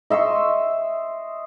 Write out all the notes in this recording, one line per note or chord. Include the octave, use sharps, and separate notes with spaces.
D#5 E5 C6 C#6